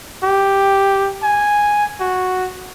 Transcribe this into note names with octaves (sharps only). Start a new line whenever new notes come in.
G4
G#5
F#4